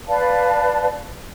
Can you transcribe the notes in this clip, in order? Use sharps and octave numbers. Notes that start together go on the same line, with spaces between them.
B4 D5 F5 A5